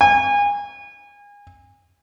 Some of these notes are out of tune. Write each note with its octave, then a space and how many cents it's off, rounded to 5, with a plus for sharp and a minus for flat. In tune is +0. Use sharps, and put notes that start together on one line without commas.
G#5 -30